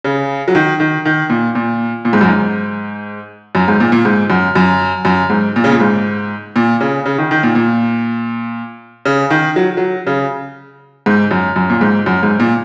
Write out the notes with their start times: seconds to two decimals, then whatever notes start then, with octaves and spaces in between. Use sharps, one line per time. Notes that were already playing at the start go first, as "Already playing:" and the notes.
0.04 C#3
0.48 F#3
0.55 D#3
0.80 D#3
1.05 D#3
1.30 A#2
1.55 A#2
2.05 A#2
2.13 G#2
2.21 F#2
2.29 G#2
3.55 F#2
3.68 G#2
3.80 A#2
3.92 A#2
4.05 G#2
4.30 F#2
4.55 F#2
5.05 F#2
5.30 G#2
5.56 A#2
5.64 C#3
5.72 A#2
5.80 G#2
6.56 A#2
6.81 C#3
7.06 C#3
7.18 D#3
7.31 D#3
7.43 A#2
7.55 A#2
9.05 C#3
9.30 D#3
9.56 F#3
9.77 F#3
10.07 C#3
11.06 G#2
11.31 F#2
11.56 F#2
11.70 A#2
11.81 G#2
12.06 F#2
12.23 G#2
12.40 A#2